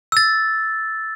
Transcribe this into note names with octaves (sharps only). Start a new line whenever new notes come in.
E6 A6